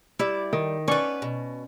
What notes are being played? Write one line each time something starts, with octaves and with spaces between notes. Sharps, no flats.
G3 E4 D5 E5
D#3
B3 C#4 B4 D5 C#6
B2